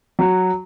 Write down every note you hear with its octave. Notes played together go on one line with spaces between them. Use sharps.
F#3